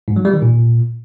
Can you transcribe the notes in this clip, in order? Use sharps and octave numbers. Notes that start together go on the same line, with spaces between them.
G#2
F#3
G3
D#3
A#2